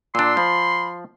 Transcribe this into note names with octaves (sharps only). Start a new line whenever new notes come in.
A#2 D4 C6 E6
F3 B5